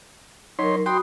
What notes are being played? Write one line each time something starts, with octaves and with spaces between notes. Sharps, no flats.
F#3 D#4 A#4 C#5 C6
F#4 G5 B5 C6 D#6